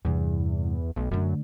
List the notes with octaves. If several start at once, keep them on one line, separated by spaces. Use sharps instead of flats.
E2 G2 C3
B1 A3
F#2 D3 A3